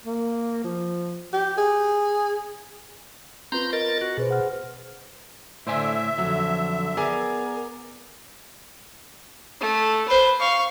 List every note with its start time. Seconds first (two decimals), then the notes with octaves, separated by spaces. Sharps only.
0.06 A#3
0.64 F3
1.33 G4
1.57 G#4
3.52 C4 F4 B4 A#5 C6 G6
3.73 A#4 D#5 A6
4.01 F#4
4.18 B2 G#4 B4 C5
4.31 F#5 F6
5.67 A2 D3 C5 D5 E5 G#5
6.18 F2 D3 F#3
6.97 B3 G#4 A#4 D5 G#5
9.61 A3
10.08 B4 C5
10.40 F5 C#6